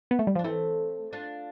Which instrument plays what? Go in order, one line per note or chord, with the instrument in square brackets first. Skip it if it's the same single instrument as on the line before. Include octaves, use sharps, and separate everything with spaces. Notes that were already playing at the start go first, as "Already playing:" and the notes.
[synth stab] B3
A3
G3
F3
[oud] D4
[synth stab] E3 [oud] A3 C4
[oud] D4 F4